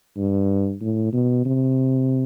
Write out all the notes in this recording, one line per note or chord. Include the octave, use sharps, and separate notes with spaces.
G2
A2
B2
C3